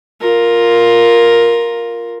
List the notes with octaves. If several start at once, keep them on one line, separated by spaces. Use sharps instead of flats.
F4 A#4